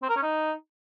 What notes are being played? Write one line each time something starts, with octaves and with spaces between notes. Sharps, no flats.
C4
A#4
C#4
D#4